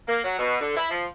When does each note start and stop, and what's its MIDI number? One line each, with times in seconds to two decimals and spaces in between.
0.08 0.20 58
0.24 0.38 54
0.39 0.60 47
0.61 0.73 50
0.76 0.89 64
0.91 1.06 53